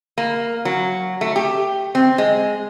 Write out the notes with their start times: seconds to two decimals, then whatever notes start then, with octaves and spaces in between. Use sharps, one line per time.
0.18 A#3
0.65 F#3
1.21 A3
1.36 G4
1.95 C4
2.18 G#3